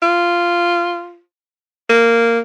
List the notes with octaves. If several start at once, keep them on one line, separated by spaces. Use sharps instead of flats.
F4
A#3